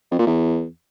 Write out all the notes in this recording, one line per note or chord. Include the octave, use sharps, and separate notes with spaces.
F2
A#2
E2